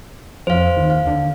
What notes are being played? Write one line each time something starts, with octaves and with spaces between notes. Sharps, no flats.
F2 C5 F5
D#2
F5
D3